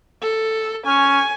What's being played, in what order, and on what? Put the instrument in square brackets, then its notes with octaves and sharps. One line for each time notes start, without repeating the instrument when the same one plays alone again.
[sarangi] A4
[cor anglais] C#4 [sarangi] G#5